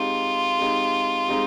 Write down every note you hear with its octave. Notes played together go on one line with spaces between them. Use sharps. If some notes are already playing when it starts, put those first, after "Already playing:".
Already playing: G#3 C4 D#4 F4 G4
G#3 C4 D#4 G4
G#3 C4 D#4 G4